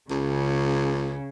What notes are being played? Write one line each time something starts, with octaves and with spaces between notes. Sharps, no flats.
C#2 C#3